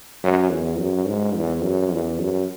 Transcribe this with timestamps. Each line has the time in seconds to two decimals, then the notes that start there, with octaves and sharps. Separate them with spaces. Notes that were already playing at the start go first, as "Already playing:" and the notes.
0.23 F#2
0.51 E2
0.79 F#2
1.08 G#2
1.36 E2
1.63 F#2
1.92 E2
2.20 F#2